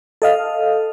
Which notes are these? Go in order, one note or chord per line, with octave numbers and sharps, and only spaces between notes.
A4 D#5 F5